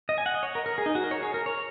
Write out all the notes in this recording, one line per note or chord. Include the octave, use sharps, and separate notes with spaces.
D#5
G#5
F#5
D#5
C#5
A#4
A#4
G#4
D#4
F#4
A#4
C#5
G#4
A#4
C#5